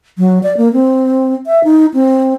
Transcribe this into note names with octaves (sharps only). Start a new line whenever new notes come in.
F#3
D5
A#3
C4
E5
D#4
C4